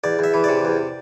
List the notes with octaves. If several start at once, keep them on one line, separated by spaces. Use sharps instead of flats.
E2 D5
E2 E5
E3
C3 D5
E2